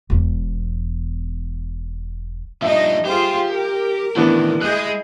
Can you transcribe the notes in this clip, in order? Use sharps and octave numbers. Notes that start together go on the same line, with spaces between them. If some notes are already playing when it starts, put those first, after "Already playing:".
E1 E2
G2 F3 D4 D#4 D#5 E5
F4 G4 G#4 C5
A#4
A2 D#3 E3 B3 D4
G#3 E4 G#4 D#5 F#6 G6